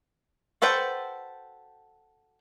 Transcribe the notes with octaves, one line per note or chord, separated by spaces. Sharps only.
F#4 A4 B4 C5 G5